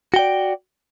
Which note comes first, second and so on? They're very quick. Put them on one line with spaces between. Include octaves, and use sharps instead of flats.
F#4 G5 D5